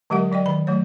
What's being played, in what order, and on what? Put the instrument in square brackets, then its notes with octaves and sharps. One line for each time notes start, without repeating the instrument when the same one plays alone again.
[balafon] D3 F#3 G#3 G4 A#4 F#5
F#3 D5 D#5 G5
D#3 B5
F#3 A3 C#5